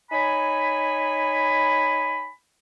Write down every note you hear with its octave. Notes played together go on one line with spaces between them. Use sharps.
D#4 C#5 G#5 B5